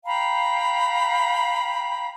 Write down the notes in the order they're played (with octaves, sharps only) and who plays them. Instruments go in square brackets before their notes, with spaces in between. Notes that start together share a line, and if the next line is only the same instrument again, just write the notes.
[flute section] F5 G5 A#5 B5